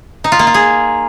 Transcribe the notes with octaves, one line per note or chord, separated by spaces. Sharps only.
D#4
F4
A#3
F4
G#4